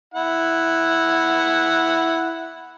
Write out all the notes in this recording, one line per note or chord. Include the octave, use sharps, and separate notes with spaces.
E4 F#5